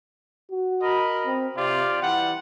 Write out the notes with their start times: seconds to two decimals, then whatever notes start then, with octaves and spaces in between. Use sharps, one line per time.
0.51 F#4
0.82 A#4 D#5 B5
1.26 C4
1.57 C3 F4 G4 D5
2.02 E3 G3 F#5